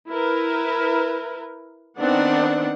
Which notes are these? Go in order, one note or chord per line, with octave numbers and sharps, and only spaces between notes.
E4 A#4 B4
D#3 B3 C4 D4 D5 F#5